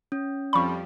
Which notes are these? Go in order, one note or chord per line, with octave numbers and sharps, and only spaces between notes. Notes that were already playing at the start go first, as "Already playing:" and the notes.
C#4
F2 F3 G3 B5 C#6